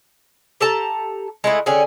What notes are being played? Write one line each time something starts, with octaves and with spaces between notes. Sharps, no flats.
G4 A4 A5 A#5
G#3 A3 E4
D3 C#4 G4 G#4